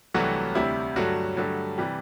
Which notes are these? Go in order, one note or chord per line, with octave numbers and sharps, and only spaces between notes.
C2 C3 E3 F#3 A3 F#4
D2 C3 G3 E4
G2 D3 F#3 A3 F#4
G2 D3 F#3 A3
C3 E3 G3